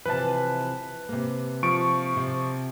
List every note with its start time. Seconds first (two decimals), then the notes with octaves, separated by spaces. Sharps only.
0.06 C3 E3 F3 B4 A5
1.09 C3 A#3
1.63 F3 C#6 D7
2.16 C3